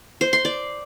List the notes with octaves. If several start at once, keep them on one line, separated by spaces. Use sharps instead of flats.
C5
C6
D5